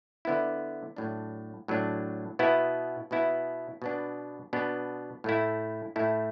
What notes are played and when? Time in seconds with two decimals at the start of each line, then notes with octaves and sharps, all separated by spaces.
0.25 D3 B3 E4
0.97 A2 F#3 D4
1.68 A2 F#3 D4
2.39 B2 B3 E4
3.11 B2 B3 E4
3.82 B2 B3 D4
4.53 B2 B3 D4
5.24 A2 A3 E4
5.96 A2 A3 E4